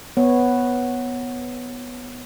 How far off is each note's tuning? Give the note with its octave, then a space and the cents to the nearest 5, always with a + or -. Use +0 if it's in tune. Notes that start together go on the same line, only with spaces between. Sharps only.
B3 +0 C#5 -10